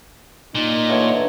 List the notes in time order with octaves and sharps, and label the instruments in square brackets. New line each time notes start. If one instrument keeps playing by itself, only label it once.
[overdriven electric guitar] A#2 [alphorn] D#4
[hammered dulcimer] D3 E3 A3 [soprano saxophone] C#5